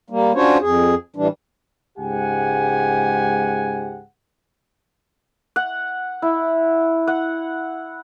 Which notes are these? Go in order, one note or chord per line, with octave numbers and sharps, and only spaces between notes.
G3 A#3
C#4 D4 F4 F#4 C5 C#5
F2 G#4
A2 E3 G3 D4
C#2 G#2 G4 F#5 G#5
F#5
E4
F#5